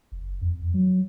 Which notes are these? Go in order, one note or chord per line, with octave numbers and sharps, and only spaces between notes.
F#1
F2
F#3